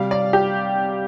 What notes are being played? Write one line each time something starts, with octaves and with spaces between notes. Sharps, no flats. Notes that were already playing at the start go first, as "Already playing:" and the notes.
Already playing: C3 G3 F5
D5
G4